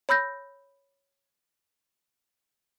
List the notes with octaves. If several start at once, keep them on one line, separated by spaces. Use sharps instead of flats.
C#5 B5 E6 G6 A#6